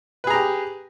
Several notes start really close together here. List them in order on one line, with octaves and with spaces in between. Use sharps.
B4 G#4 A#5 G4